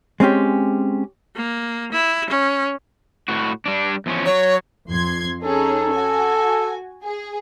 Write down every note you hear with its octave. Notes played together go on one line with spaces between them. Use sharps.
G#3 C4 C#4 G4
A#3
E4
C#4
A2 F#4
G3 D4
E2 F3 C#4
F#3 C#5
F2 C6 G#6
C#4 D#4 G#4 A4
F#4 G#5
G#4